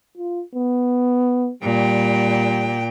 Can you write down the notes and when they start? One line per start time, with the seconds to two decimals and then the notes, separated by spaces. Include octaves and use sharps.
0.17 F4
0.55 B3
1.63 A#2 G3 G5